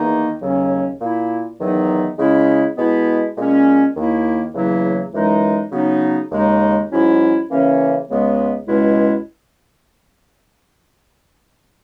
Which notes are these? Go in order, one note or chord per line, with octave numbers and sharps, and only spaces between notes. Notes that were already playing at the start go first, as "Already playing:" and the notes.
Already playing: E2 D#3 A#3 D#4
D#2 C#3 F#3 C#4
A#2 A#3 E4
E2 D#3 F#3 B3 D#4
C#3 G#3 C#4 E4
B2 G#3 B3 E4
A#2 G#3 C#4
D#2 D#3 A#3 E4
E2 C#3 F#3 A#3 E4
F#2 E3 G#3 D#4
C#3 F#3 B3 D#4
D#2 C#3 G#3 D#4
G#2 F#3 C#4 E4
C#3 E3 A#3 C#4
C#2 C#3 G#3 B3
C#2 B2 G#3 C#4 E4